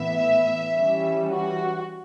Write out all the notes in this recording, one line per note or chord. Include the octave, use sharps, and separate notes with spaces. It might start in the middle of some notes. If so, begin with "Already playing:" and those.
Already playing: A2 E3 B3 E5
E3 G3 C#4
F#4